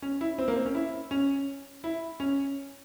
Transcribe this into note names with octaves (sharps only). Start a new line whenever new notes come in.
C#4
E4
C4
A#3
C4
C#4
E4
C#4
E4
C#4